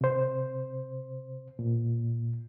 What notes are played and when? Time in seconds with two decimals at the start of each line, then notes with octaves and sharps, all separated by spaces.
0.01 C3 C5
1.59 A#2